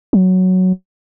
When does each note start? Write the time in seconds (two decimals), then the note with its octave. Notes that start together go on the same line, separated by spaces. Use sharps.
0.13 F#3